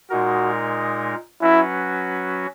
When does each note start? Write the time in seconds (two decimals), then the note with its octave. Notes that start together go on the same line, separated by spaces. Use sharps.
0.10 A#2 G#3 D#4 F#4 A#4
1.41 F#3 C#4 E4 F#4 B4